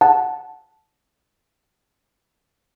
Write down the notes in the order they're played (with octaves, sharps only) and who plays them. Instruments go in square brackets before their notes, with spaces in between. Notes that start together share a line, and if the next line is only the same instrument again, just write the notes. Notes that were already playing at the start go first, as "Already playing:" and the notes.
[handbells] F#5 A5